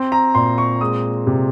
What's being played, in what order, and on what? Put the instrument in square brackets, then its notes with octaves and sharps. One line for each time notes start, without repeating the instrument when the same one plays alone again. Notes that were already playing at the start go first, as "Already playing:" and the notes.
Already playing: [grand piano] C4
A#5
A#2 C6
C#6
G#3 D#6
C3